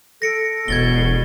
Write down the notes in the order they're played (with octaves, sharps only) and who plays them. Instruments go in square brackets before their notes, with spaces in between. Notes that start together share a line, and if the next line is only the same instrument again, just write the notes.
[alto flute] A4 [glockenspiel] A#6 C#7 D7
[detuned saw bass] E1 [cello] B2 [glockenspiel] G#6 A6 G7